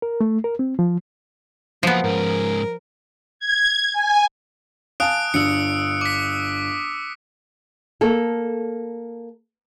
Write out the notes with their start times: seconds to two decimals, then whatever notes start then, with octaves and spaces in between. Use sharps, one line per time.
0.02 A#4
0.21 A3
0.44 A#4
0.59 C4
0.79 F3
1.83 F3 F#3 A#3 B3
2.04 G#2 C#4 A#4
3.39 G#6
3.93 G#5
5.00 F5 G#5 A5 D#6 F#6 D7
5.34 G1 D4 E6 C#7 D7
6.01 D6 B6
8.01 A#3 A4